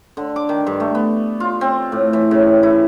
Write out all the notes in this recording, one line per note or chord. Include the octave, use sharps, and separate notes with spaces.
D3
D6
D#3
G2
A3
B3
F4
C4
A2
E3
C#3
E4